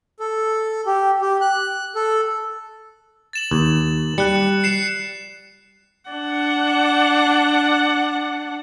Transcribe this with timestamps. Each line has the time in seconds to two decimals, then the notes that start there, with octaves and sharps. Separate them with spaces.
0.20 A4
0.86 G4
1.21 G4
1.41 F#6
1.95 A4
3.33 A6 E7 F#7
3.51 D#2
4.18 G3 F#6 C#7
4.64 C7 C#7 E7
6.10 D4 F#5